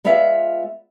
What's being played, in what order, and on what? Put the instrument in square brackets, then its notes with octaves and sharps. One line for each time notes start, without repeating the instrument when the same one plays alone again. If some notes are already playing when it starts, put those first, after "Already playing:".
[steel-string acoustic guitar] G#3 B3 F4 D5 E5 F5